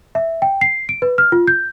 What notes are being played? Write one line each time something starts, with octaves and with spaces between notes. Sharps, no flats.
E5
G5
C7
D7
B4
F6
F4
G6